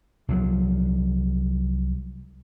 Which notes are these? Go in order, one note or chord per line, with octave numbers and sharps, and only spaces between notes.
C2 F3 F#3